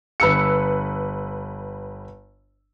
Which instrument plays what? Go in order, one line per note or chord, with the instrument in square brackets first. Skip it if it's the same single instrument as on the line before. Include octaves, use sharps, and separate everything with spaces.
[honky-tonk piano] G1 B4 E6 C#7